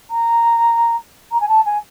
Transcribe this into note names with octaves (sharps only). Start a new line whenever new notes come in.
A#5
A#5
G#5
A5
G#5